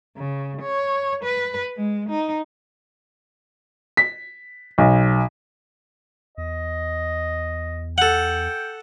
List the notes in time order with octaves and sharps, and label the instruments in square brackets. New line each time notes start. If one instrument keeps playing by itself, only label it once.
[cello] C#3
C#5
B4
G#3
D#4
[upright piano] B6
B1
[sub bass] E2 [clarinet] D#5
[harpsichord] A4 F#5 [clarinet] G5